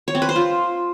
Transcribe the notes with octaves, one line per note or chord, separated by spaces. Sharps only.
C#5
C4
B4
C5
F4